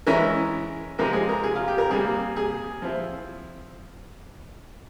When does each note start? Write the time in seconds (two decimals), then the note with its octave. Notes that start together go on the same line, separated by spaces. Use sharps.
0.07 E3 G#3 C#4 E4 A#4
0.98 C3 F3 G#3 C4 A#4
1.13 G#4
1.29 A#4
1.44 G#4
1.56 F4
1.68 G4
1.78 A#4
1.90 C3 G3 A#3 G#4
2.36 G#4
2.82 F3 C4 E4